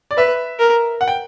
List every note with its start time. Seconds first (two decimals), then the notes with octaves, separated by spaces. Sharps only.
0.11 D5
0.17 B4 E5
0.59 A#4
1.01 F#5
1.08 G5